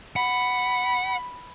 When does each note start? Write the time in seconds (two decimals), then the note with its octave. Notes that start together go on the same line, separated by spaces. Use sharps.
0.16 F#5 B5